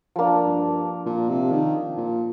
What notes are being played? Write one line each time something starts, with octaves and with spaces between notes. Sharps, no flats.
F3 A#3 D4
G2
A#2
C3
D#3
A#2